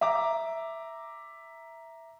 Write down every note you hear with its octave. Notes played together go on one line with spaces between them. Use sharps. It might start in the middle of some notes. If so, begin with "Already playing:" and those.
E5 A#5 D6